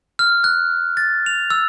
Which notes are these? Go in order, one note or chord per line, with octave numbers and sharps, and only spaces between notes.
F6
F#6
A6
F7
E6